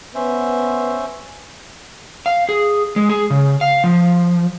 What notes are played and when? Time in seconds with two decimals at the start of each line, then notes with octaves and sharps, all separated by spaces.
0.15 B3 C#4 C5 E5
2.26 F5
2.49 G#4
2.96 G#3
3.09 G#4
3.31 C#3
3.61 F5
3.84 F3